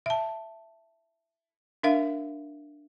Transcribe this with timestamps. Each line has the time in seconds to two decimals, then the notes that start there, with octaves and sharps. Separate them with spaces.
0.06 E5 A5
1.83 D4 A#4 E5 F5